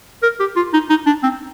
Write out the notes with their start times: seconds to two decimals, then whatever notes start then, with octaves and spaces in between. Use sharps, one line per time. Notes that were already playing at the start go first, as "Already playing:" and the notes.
0.23 A#4
0.40 G4
0.56 F4
0.73 D#4
0.89 D#4
1.06 D4
1.23 C4